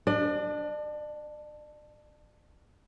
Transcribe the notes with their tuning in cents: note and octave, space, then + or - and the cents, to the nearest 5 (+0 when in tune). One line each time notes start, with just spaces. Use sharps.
D4 +0 D5 +40